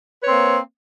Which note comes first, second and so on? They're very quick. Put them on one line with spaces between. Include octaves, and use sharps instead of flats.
B4 C#5 C4 A#3